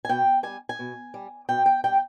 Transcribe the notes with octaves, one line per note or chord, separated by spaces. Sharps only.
G#5
B2 G5
G3 G#5
G#5
B2
G3
B2 G5
G5
G3 G5